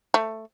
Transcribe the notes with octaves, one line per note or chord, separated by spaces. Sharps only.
A3